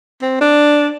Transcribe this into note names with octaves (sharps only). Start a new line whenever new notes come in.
C4
D4